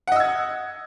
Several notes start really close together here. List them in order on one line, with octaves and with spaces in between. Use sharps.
F#5 D#5 E6 G#6